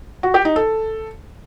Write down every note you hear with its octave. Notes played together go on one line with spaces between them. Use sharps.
F#4
G4
D#4
A4